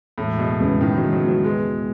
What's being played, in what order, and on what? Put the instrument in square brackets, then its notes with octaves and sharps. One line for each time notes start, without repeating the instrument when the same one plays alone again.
[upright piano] E1 [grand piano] A2
[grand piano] B2 [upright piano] G#3
[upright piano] E2 [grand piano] C#3
[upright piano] E2 [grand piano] D#3
[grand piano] F#3 [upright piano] G#3
[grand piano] F#3
[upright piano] B2 [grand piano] F#3
[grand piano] G#3